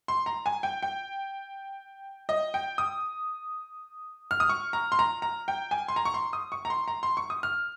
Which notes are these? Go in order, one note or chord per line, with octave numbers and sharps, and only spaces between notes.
C6
A#5
G#5
G5
G5
D#5
G5
D#6
F6
D#6
C#6
A#5
C6
A#5
A#5
G5
G#5
C6
A#5
C#6
C6
D#6
C#6
A#5
C6
A#5
C6
C#6
D#6
F6